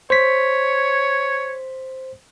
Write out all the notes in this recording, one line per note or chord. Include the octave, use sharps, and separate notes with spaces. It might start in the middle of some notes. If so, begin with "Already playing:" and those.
C5 C#5 B6